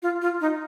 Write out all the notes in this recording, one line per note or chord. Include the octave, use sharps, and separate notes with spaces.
F4
F4
D#4